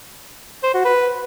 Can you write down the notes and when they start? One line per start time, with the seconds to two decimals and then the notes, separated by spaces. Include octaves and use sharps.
0.63 C5
0.74 F#4
0.85 B4